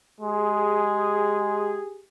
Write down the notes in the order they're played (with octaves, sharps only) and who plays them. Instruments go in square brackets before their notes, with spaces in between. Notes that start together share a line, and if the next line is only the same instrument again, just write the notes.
[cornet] G#3 [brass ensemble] G4 G#4